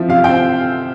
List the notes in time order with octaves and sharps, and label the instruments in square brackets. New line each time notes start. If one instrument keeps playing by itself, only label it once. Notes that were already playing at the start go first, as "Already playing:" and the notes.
Already playing: [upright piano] F3 C4 E4
C3 F5
G5
C4